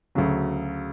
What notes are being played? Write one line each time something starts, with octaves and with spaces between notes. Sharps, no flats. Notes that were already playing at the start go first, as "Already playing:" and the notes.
D2 C#3 F#3